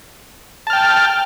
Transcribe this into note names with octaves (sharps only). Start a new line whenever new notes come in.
G5 A5 F6